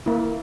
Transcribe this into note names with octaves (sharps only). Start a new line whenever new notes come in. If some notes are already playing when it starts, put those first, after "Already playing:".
A#3 E4